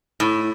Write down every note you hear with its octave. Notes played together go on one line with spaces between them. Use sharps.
A2